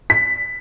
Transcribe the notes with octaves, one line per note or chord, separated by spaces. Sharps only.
B6